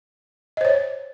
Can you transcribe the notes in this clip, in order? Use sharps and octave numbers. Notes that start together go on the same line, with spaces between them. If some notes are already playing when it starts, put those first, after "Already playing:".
C5 C#5 D#5